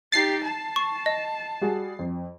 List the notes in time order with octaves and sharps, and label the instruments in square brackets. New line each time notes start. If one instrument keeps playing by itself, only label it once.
[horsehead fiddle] D#4 G4 [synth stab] A6 C7
[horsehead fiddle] A5
[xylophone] C#6
D#5
[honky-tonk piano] G3 F#4 G#4
F2